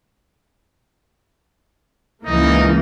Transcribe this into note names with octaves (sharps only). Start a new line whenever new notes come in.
C#2 E3 A#3 D#4